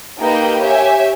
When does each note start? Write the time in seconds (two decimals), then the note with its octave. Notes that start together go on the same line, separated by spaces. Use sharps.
0.18 A#3 D#4 G4 B4 G5
0.61 G4 C#5 E5 G#5